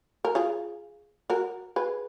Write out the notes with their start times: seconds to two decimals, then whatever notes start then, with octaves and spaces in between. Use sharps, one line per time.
0.25 A#4
0.35 F4 G#4
1.30 F#4 A#4
1.76 G#4 B4